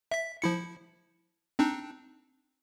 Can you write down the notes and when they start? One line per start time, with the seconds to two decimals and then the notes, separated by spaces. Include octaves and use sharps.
0.11 E5 B6
0.42 F3 E4 C#7
1.59 C4 D4 D#4